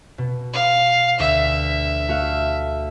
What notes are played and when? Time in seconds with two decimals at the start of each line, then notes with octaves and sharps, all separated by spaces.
0.18 B2
0.53 F5
1.19 D2 E5
2.08 A3 F#4 F5